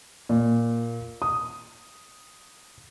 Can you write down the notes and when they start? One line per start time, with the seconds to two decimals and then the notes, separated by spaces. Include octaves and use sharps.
0.29 A#2
1.22 D#6